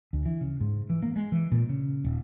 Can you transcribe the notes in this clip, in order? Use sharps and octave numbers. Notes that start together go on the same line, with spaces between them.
D2
E3
C#3
G#2
E3
A#3
G#3
E3
A#2
C#3
D#1